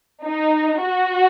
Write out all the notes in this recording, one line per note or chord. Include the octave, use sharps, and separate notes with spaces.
D#4
F#4